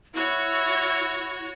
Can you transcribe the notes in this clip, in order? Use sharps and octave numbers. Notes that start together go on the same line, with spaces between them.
E4 F#4 C#5